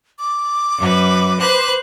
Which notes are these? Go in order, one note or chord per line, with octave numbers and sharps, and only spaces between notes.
D6
F#2 B4
B4 C5 F#6